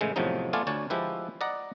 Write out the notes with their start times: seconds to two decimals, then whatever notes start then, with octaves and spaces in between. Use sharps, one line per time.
0.01 A2 C#3 E3 G#3
0.16 E2 A2 C3 F3 F#3 D#4
0.53 A3 B3 F4 D5 F5 G#5
0.67 D2 D4 C#5 G#5 A5
0.90 F3 G#3 E4 G4 B4
1.41 D5 D#5 F#5 A#5